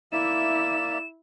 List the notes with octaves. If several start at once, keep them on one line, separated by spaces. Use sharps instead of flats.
A#3 E4 D5 E5 E7